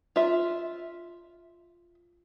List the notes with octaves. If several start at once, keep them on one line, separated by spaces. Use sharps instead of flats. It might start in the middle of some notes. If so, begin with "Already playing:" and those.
F4 E5